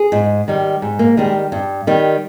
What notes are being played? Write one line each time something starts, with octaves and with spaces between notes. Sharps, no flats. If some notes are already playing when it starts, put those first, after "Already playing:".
Already playing: G#4
G#2
D#3 G3
G#2
A#3
D#3 G3 G#3
G2
D#3 G3